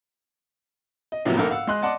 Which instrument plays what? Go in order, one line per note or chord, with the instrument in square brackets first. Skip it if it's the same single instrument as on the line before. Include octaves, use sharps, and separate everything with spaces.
[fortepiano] D#5
A2 C3 F3 F#3 A#3 B3
A#1 G#2 A#3 A4 A#4
F5 F#5 E6
G#3 D#5 C6 F#6
D5 D#5 F#5 A5 C6 D6